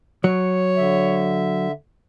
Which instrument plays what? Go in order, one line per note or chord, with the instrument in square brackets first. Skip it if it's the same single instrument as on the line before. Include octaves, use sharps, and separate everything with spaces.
[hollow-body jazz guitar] F#3 [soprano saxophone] C#5
[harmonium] D3 E5